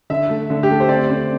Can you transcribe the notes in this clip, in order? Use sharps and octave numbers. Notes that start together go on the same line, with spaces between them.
D3 E5
A3
D3
G4
A3 A4
C5
C4 D5
C4